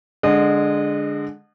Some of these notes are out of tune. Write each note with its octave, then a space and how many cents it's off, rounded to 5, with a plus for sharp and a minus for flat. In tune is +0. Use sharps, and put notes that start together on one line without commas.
D3 +0 G#3 +0 D#5 -30